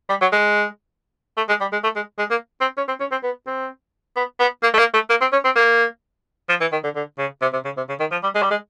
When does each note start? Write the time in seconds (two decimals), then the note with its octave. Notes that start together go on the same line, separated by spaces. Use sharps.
0.09 G3
0.21 F#3
0.33 G#3
1.37 A3
1.49 G#3
1.61 G3
1.72 G#3
1.84 A3
1.96 G#3
2.19 G#3
2.31 A#3
2.61 C4
2.77 C#4
2.88 C4
3.00 C#4
3.12 C4
3.23 B3
3.47 C4
4.16 B3
4.39 B3
4.63 A#3
4.74 A3
4.79 A#3
4.94 A3
5.10 A#3
5.21 C4
5.33 C#4
5.45 C4
5.56 A#3
6.49 F3
6.61 E3
6.72 D#3
6.84 D3
6.96 D3
7.19 C#3
7.42 C3
7.53 C3
7.65 C#3
7.77 C3
7.89 C#3
8.00 D#3
8.12 F3
8.23 G3
8.35 G#3
8.43 G3
8.51 G#3